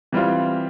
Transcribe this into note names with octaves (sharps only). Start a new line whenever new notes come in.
E3 G3 C4 F4